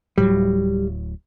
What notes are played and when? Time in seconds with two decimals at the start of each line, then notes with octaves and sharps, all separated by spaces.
0.18 D1 A2 F#3 G3